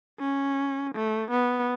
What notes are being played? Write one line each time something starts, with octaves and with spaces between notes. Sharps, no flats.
C#4
A3
B3